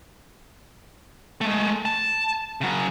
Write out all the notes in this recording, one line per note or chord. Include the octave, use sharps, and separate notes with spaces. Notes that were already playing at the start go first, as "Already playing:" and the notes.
G#3 A3
A5
C#3 F#3